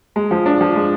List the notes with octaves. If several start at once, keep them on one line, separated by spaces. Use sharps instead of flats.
G#3
F3
D4
F3
G#3